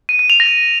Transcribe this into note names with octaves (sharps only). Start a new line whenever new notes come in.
D#7
D#7
F7
A#6